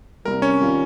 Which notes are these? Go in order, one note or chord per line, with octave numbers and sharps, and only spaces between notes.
C2 C3 G3 A#3 A#4
C#4 C#5
D#3 G3 C#4 F4